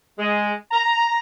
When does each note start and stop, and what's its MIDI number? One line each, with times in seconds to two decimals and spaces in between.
0.19 0.52 56
0.71 1.19 82